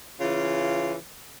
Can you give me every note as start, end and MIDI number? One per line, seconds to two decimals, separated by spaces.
0.20 0.94 49
0.20 0.94 52
0.20 0.94 65